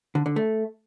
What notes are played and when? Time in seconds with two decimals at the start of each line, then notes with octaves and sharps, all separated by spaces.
0.15 D3
0.26 D3
0.36 A3